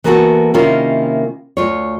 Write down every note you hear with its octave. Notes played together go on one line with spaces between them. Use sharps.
E3 A#3 B3 F4 F#4 A4
C3 D#3 A#3 C#4 E4 F4
D2 F4 C#5